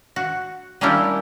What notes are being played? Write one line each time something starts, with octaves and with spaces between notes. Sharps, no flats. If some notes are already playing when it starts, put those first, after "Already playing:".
F#4
G3 A#3 C#4 D4 E4 G4